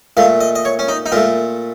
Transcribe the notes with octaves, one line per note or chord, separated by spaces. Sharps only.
A#2 A3 F5
D#5
D#5
C#5
C#4
D#4
D#4
A#2 A3 F4